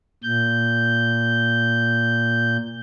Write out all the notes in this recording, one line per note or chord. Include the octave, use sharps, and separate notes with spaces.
A#2 G6